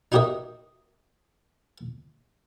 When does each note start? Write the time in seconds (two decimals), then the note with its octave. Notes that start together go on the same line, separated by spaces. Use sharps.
0.12 D#4 F#4 G4 A#4 D#5 E5